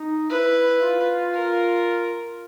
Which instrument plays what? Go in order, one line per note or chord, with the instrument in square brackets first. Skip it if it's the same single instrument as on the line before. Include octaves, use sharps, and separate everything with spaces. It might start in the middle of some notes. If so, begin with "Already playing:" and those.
Already playing: [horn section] D#4
[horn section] E4 [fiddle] B4
[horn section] F4
[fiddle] A#4